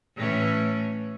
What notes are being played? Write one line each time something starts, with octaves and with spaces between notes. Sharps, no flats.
A2 E3 C#4